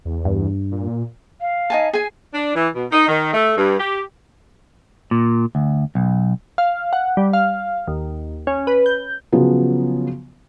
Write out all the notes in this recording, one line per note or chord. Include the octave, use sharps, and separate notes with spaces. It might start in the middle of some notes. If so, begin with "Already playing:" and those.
E2
G2
A#2
F5
D#4 G#5 A5
G#4 G#5
D4
E3
B2
D#4
D#3
A3
G2
G4
A#2
D2
B1
F5
F#5
G3
F5
D#2
C#4
B4
G6
C#3 F3 F#3 B3